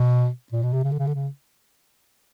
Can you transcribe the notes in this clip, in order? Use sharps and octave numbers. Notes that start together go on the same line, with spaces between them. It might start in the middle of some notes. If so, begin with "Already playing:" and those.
Already playing: B2
A#2
B2
C3
C#3
D3
C#3
D3
C#3